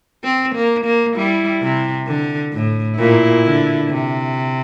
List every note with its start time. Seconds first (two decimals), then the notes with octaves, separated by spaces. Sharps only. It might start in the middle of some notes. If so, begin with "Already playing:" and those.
0.24 C4
0.55 A#3
0.85 A#3
1.16 G3 E4
1.62 C3
2.07 D3
2.52 A2
2.98 A#2 E4
3.44 D3
3.90 C3